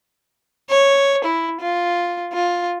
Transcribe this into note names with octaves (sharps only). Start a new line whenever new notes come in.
C#5
E4
F4
F4